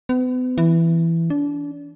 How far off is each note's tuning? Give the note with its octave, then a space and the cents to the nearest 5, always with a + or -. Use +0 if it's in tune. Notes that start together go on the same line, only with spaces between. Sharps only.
B3 +40
E3 +10
D4 -30